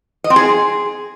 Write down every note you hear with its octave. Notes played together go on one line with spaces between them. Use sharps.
D#5
C4
G#4